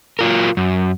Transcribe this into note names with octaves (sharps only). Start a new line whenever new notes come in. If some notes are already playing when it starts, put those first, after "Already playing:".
F#3 F4 A#4
F#2